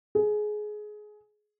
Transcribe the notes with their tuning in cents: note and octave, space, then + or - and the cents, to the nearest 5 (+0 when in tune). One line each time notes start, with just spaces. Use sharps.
G#4 +20